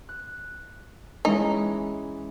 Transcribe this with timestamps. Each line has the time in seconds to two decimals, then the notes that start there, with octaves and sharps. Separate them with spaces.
0.09 F#6
1.25 E3 G#3 C#4 D#4